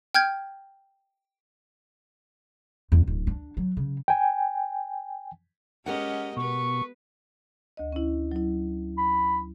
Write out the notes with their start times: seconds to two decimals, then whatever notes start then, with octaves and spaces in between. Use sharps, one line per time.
0.15 G5 F6 G6 G#6
2.92 E2
3.07 D1
3.27 D4
3.57 F#3
3.77 C#3
4.08 G5 G#5
5.86 G#3 C#4 G4 A#4 D#5 F#5
6.37 B2 B3 B4 C#6
7.77 D2 D#5
7.92 C#4 E4
8.32 F#3 E4
8.97 B5